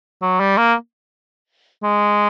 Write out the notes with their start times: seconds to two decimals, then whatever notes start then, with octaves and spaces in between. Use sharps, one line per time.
0.22 F#3
0.40 G3
0.58 A#3
1.83 G#3